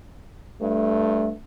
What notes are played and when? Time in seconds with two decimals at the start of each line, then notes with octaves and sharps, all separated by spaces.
0.61 G2 A3